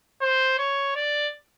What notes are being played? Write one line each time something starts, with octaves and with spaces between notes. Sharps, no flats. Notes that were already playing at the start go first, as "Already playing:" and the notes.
C5
C#5
D5